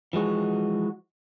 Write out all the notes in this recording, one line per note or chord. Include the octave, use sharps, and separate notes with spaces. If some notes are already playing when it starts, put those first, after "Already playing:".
E3 F3 G#3 F#4